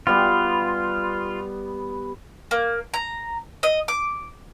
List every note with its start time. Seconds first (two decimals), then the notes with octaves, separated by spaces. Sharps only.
0.07 G3 B3 F4
2.51 A#3
2.94 A#5
3.63 D#5
3.88 D6